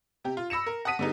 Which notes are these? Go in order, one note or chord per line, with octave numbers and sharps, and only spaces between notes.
C3 G4
F4
B5 E6 A#6 C#7 E7
A#4
F#5 A5 D#6 B6 D#7
D3 G3 B3 D#4 G#4